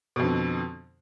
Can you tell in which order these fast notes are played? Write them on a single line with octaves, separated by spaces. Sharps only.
B2 F2 D3